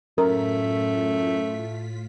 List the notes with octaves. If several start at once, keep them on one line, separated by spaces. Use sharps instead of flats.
F#2 A2 A3 F4 A#4 B6